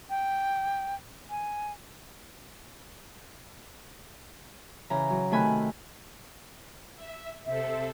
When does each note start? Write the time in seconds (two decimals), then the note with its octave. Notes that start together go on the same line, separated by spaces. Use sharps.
0.10 G5
1.30 G#5
4.90 C#3 E3 A#5
5.10 F#3
5.31 C3 D#3 A3 G#5 B5 F#6
6.96 E5
7.46 C3 C4 A4 E5